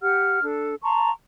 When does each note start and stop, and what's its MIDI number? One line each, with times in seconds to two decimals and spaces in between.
0.01 0.42 67
0.01 0.42 78
0.01 0.42 89
0.42 0.75 62
0.42 0.75 69
0.82 1.10 81
0.82 1.10 82
0.82 1.10 84
0.82 1.10 85